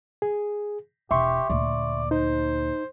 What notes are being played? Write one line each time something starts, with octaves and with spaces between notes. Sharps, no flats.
G#4
E1 G4 E5 C6 C#6
D2 A#2 D5
D#4 C5